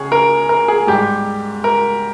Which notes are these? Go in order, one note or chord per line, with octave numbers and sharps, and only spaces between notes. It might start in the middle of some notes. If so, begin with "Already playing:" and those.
Already playing: C#2 C#3 G#4 C#5
A#4
A#4
G#4
G#2 G3 G4
A#4